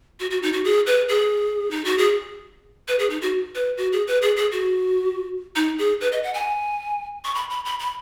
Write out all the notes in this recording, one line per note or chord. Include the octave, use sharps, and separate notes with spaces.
F#4
F#4
D#4
F#4
G#4
B4
G#4
D#4
F#4
G#4
B4
G#4
D#4
F#4
B4
F#4
G#4
B4
G#4
G#4
F#4
D#4
G#4
B4
D#5
F#5
G#5
C#6
B5
B5
B5
B5